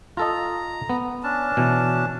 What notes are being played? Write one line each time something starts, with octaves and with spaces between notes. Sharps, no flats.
F4 A4 D#5 A#5
B3
C#4 D4 A5
B2 E3